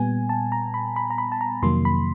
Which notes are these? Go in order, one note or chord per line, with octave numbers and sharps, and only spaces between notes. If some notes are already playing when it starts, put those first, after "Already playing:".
Already playing: A#2 G3 B3 G#5
A5
A#5
B5
B5
A#5
B5
A5
A#5
F2 C3 D#3 F#3 A#3 C6
B5